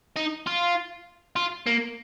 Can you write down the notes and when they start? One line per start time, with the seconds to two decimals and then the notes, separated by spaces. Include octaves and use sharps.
0.16 D#4
0.47 F4
1.36 F4
1.66 A#3